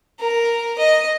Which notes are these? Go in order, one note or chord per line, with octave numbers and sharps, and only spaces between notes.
A#4
D#5